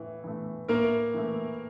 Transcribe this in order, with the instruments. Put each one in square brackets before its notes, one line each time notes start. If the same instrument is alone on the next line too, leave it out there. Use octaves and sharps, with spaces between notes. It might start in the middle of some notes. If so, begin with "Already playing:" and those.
Already playing: [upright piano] A2 E3
E3 A3
[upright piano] A2 [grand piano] A#3 A#4
[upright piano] E3 A3